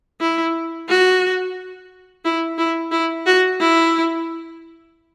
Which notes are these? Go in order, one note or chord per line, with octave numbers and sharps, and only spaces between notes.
E4
F#4
E4
E4
E4
F#4
E4